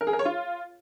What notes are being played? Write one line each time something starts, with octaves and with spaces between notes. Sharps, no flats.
A#4
G#4
A#4
C#5
F4